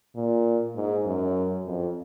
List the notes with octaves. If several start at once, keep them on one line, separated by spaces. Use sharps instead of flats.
A#2
G#2
F#2
F2